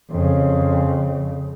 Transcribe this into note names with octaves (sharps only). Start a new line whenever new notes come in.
F2 C#3